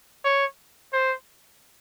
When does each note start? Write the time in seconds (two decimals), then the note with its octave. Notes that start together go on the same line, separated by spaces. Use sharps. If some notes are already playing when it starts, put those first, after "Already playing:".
0.24 C#5
0.93 C5